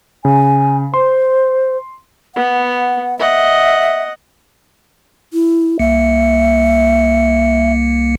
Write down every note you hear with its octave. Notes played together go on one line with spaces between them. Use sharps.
C#3 G#5
C5 C6
B3 F#5
D#5 E5 F#5
E4
C2 A#3 E5 C#7